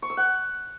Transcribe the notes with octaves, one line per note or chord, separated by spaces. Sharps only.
C#6
E6
F#5